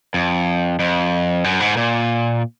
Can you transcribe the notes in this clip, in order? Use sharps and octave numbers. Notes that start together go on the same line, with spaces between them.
F2
F2
F#2
G#2
A#2